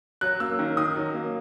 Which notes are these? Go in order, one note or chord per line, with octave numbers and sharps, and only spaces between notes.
F#3 F#6
A#3 E6
D#3
D#3 D#6
F#3
A#3